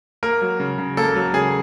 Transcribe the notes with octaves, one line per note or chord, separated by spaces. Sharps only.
A#3 A#4
F#3
C#3
C#3
A#3 A4
F#3
C#3 G#4